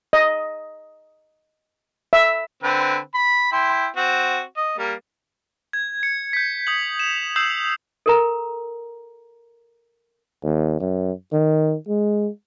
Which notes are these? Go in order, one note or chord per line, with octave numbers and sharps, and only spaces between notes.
D#5
E5
D3 C4 B4
B5
E4 G5 C6
C4 F#4
D#5
G3 A#3
G#6
C#7
G6 B6
D#6 G6 F#7
E7 F7
D#6 E6 G6 C7 E7 F#7
A4 A#4 A#5
D#2
F#2
D#3
G#3